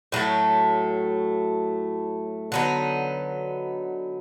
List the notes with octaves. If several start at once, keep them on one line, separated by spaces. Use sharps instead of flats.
A2 F#3 A3
D3 F#3 B3 D#4